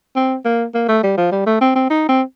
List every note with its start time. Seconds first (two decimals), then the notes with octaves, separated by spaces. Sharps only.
0.16 C4
0.45 A#3
0.74 A#3
0.89 A3
1.03 G3
1.17 F3
1.32 G3
1.46 A3
1.61 C4
1.76 C4
1.90 D#4
2.09 C4